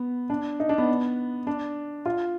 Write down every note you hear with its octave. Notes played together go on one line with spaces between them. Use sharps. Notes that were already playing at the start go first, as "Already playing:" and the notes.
Already playing: B3
D4
D#4
D4
B3
D4
F4